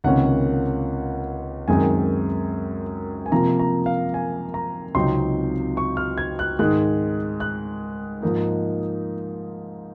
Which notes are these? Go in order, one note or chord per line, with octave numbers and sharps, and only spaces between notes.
C#2 C3 D#3 A#3 C#4 F#5
F#2 D#3 G#3 C4 G#5
G#5
C3 F3 A#3 A#5
A#5
F5
G#5
A#5
C#2 C3 F#3 C4 D#4 C6
C#6
F6
G#6
F#6
G#2 D#3 G#3 F#6
F#6
G#2 F3 A#3 D#4